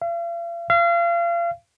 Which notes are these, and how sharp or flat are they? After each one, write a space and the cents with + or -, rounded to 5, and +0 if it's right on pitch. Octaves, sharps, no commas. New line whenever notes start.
F5 -45
F5 -35